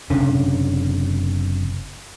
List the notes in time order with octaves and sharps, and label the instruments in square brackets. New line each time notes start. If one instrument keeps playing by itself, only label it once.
[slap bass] F#1 C3 C#4 D4